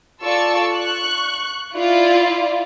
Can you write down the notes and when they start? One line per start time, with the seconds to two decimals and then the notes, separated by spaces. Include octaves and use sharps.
0.22 F4 A4 D5 A5 C#6 E6
0.74 C#6 F#6
1.74 E4 F4 D5